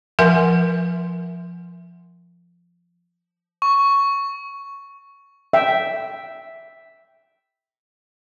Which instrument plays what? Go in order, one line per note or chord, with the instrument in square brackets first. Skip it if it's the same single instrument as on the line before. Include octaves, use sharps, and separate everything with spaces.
[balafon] F3 A#4 E5 F#5 G#5
[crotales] C#6
[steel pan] E5 G5